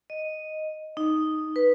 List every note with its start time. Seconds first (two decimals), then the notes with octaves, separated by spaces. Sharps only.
0.10 D#5
0.97 D#4
1.56 B4